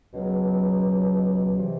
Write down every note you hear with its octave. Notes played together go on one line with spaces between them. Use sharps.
C#2 B2 F#3
C3 E3